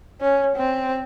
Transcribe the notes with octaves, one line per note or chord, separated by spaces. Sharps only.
C#4
C4